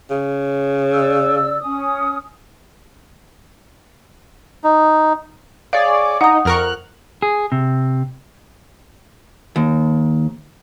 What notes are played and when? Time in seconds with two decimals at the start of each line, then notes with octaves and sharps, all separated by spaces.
0.10 C#3
0.92 D5 E6
1.61 C#4 D#6
4.64 D#4
5.73 G#4 C#5 D5 F5
6.21 D#4 F#5 D#6
6.45 F2 A#4 C#6 F6 F#6
7.22 G#4
7.52 C3
9.56 D#2